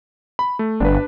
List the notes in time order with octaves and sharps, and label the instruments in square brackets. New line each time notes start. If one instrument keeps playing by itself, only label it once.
[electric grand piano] B5
A3
[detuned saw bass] G1 [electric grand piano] D4 B4